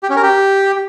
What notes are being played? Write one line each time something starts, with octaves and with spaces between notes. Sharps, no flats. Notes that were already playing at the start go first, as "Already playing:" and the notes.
G4
C#4
A#4
G4